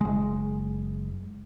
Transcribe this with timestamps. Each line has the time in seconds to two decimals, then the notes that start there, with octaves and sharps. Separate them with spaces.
0.01 F#1 G#3